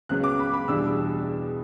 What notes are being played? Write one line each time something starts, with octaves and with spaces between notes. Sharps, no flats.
C#2 C#3 F#3 B3 F#6
D6
B5
B5
E2 B2 G3 D4 E6